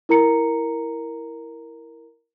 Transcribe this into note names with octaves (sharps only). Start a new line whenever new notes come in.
E4 A#4 A#5 C#7